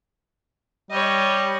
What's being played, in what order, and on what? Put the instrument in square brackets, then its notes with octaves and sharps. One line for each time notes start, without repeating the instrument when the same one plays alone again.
[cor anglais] G3 [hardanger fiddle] C#5 D#5